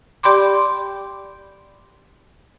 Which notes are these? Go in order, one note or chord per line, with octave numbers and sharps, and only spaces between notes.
G4 D5 G5 B5 C6 D6